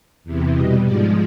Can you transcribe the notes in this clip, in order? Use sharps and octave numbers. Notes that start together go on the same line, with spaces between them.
E2 C3 E3
B2 G3 D#5
G#2 F3 G#3 D5